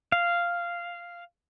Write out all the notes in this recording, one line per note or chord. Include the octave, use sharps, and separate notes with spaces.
F5